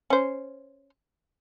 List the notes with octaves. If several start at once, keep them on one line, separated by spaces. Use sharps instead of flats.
C#4 C5